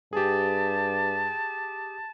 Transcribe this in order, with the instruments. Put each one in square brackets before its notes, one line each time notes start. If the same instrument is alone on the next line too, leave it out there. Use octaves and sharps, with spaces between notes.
[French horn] G2 [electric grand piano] G4 G#4 [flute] A5